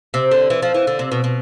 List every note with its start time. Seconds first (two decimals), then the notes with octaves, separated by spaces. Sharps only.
0.14 C3
0.31 D3
0.50 E3
0.62 F3
0.74 E3
0.87 D3
0.99 C3
1.12 B2
1.24 B2